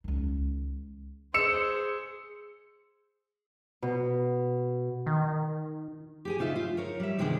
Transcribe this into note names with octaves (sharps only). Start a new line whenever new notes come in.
C#2 D#3
G#4 C5 E6 C#7 E7
B2
D#3
G4 G#4 G#5
D2 C#3 D#4 F4 E5
F4
A#4 C#5
G3 E5
C3 D#3 G3 G#3 B3 D4